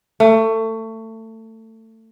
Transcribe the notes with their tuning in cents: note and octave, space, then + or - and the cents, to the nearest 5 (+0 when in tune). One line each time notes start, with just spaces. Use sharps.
A3 +25